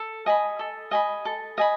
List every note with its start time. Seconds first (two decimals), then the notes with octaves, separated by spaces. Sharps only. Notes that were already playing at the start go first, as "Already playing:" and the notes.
Already playing: A4
0.26 D#5 G#5 B5
0.59 A4
0.91 D#5 G#5 B5
1.25 A4
1.58 D#5 G#5 B5